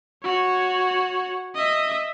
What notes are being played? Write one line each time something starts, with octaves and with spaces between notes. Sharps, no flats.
F#4 C#5
D#5 E5